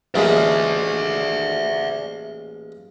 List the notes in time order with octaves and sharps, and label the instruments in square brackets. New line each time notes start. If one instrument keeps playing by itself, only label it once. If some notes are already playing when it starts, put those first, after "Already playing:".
[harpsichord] A1 A#2 G#3 [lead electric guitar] D5 E5